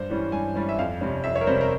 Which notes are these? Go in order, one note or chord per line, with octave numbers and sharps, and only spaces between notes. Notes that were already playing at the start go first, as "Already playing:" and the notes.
Already playing: G2 C5
E3 G3 C#4
G2 G#5
E3 G3 C#4
E5
F2 F5
C3 G3 C#4
F2 E5
C#5
A#4
C3 G3 C#4 C5
A#4